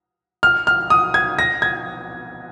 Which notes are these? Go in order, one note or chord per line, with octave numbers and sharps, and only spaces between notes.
F6
F6
D#6
G#6
A#6
G#6